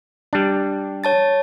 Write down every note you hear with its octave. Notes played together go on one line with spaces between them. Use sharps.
G3 D4
C#5 A5 A6